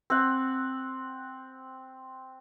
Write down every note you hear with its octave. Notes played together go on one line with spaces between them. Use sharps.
C4 F#5